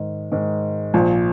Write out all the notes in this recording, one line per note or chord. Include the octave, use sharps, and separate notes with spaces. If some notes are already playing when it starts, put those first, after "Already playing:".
Already playing: G#2 D#3 G#3
G#2 D#3 G#3
A#1 A#2 F3